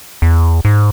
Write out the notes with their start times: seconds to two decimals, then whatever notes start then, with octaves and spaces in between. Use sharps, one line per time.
0.22 E2
0.65 G#2